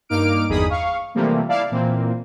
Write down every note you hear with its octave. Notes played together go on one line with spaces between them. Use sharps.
G2 A#3 D#4 D6 F6 D7
G1 E2 D#4 G#4 B5 D#6
F5 C#6
C3 E3 F3 G3 A3 A#3
E4 D5 F5 A5
A#2 E3 A#3 C4